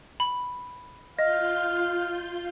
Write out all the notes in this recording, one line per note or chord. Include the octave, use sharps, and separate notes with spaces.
B5
F4 D#5 F5 G6